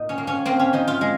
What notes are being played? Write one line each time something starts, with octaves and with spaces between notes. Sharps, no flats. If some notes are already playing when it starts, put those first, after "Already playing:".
Already playing: A#2 D#4
C#4
A#3
C#4
A#3 C4
C#4
F3 D#4
F4
G#3